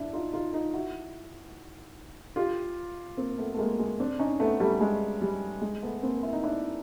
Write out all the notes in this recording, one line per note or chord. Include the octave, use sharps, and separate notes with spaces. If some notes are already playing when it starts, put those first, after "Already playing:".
Already playing: D4 E4
D#4 F4
D#4 F4
D#4 F4
E4 F#4
F4 G4
A#3 C4
A3 B3
A3
G#3 A#3
G#3
C4 D4
C#4 D#4
A3 B3
G3 A3
G#3
G3
G#3
A3 B3
A#3 C4
E4
D#4
D4 E4